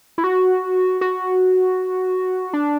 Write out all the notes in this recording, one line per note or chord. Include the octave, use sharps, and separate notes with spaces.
E4
F#4
F#4
D4